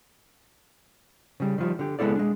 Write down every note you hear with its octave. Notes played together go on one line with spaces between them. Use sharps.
C#3 G3
D#3 F3 G3
D3 G4
C#2 G#3 B3 E4 A4 D5
G#3 D4